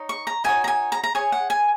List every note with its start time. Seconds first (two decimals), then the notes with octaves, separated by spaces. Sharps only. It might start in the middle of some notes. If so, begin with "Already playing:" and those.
Already playing: D#4 C#5
0.09 C#6
0.27 A#5
0.44 D#4 F#4 C#5 G#5
0.64 A#5
0.68 G#5
0.92 A#5
1.04 A#5
1.15 G#4 C#5 G#5
1.32 F#5
1.50 G#5